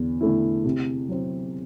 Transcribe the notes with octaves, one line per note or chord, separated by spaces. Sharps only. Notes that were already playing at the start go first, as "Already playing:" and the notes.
Already playing: E2 D3 E4
D3 A3 E4
C3
F#3 C4